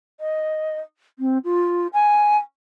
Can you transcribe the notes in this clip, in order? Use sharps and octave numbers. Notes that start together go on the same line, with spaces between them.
D#5
C4
F4
G#5